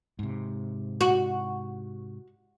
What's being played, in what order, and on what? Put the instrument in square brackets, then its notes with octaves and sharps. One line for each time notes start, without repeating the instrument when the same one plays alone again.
[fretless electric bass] G#2 C3
[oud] F#4